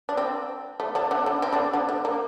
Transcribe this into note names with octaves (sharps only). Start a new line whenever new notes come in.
D4
C4
A3
D3 D4
D3 D4
D3 D4
C4
D3 D4
D3 D4
D3 D4
A#3